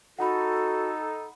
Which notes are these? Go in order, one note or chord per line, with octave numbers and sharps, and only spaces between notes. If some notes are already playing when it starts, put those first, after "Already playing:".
D#4 F#4 A4 F#5 B5